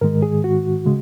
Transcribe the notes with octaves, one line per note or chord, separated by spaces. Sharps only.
G#2 D#3 G#3 A#4
G#4
F#4
C#3 G#3